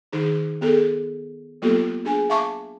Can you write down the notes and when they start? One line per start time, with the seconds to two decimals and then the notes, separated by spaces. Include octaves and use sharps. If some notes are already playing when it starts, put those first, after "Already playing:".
0.13 D#3 D#4 G#4
0.61 B3 G#4 A4
1.62 F#3 A#3 B3 F4 G4 A4
2.05 D4 G#4 G#5
2.30 E5 F5 A5 C#6 D6